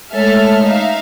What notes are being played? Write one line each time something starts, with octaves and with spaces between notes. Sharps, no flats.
G#3 A3 A4 C#5 E5 F6
D#4 E5 F5